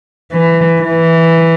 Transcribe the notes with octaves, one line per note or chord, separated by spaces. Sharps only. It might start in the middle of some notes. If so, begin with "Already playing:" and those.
E3
E3